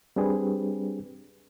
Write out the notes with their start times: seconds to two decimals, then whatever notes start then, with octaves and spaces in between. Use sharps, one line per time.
0.16 G3 C4 D4 G4 G#4 B4